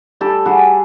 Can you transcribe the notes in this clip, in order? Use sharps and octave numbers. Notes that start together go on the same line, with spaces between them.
G3 G4 A4
G3 F#4 G#4